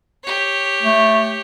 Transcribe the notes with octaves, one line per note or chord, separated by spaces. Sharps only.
G4 C#5
A3